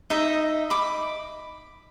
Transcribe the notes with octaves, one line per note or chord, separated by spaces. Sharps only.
D#4 D#5 E5
B5 D6